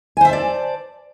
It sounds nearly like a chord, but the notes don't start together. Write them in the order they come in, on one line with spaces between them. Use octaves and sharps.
G#5 C5 E5 A5 D5